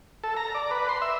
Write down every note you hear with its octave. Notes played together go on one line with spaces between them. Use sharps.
A4
A#5
D5
B4
C6
E5